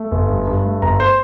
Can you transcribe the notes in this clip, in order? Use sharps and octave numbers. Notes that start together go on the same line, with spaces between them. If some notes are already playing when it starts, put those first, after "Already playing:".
Already playing: A3
G1
G2
G2
A3
G1 A#5
C5